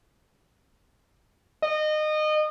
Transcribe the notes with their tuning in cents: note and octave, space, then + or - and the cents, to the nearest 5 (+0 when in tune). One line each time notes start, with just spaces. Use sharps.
D#5 -25